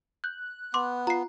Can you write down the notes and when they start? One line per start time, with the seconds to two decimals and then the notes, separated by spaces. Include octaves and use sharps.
0.24 F#6 G6
0.74 B3 C6 D6
1.07 F4 A#5 C7